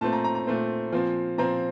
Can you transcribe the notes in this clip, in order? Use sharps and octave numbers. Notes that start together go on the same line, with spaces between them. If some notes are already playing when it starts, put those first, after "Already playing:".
A#2 A3 C4 A5
A#5
A#5
A#5
A#2 A3 C4
A#2 F3 C4
A#2 F3 C4 A#5